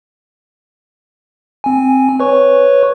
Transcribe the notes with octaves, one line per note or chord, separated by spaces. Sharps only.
C4 G#5
B4 C#5 C#6